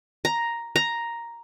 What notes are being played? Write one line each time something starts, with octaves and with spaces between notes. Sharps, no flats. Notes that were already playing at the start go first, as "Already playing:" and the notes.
A#5
A#5